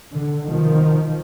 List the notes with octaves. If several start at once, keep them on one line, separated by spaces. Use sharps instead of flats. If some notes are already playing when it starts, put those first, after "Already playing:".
D3
C2 B2 D#3 F3